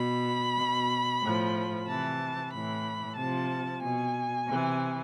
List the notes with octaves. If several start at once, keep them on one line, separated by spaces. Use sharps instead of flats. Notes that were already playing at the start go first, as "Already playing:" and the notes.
Already playing: B2 B5
B2
A2 F3
C3 E3 A5
A2 E3 B5
C3 F3 A5
B2 G#5
C3 E3